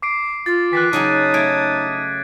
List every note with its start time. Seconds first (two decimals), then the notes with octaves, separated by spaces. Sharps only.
0.02 D6 C7 D7
0.46 F4 A6
0.73 D#3 E3 F#6 A6 B6
0.93 C#3 F#3 D#4 G#4 D#5 A5 D#6
1.34 A3 G#6 D7